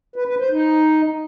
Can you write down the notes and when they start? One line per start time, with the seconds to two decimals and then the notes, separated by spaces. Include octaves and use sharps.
0.16 B4
0.28 B4
0.39 C5
0.51 D#4